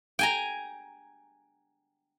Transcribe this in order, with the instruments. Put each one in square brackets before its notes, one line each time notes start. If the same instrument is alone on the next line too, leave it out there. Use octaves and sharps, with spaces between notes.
[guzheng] G5 G#5 A#5